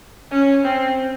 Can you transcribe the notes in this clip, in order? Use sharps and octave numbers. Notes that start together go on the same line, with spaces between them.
C#4
C4